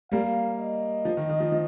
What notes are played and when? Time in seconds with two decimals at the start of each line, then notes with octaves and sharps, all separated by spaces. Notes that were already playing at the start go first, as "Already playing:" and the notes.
0.12 G3 A#3 F5
0.59 D#5
1.05 F3
1.17 D#3
1.29 D#3
1.40 F3
1.52 F3